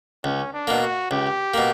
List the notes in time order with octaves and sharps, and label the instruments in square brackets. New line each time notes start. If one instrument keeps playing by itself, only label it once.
[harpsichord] C#2 [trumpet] C#4
[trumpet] D4
[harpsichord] B2 A#3
[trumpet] F#4
[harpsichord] C#2 [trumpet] G4
[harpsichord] B2 A#3